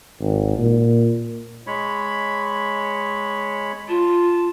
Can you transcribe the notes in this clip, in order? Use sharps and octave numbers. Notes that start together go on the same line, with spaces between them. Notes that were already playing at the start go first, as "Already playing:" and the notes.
G#1
A#2
G#3 C#5 B5
F4 A5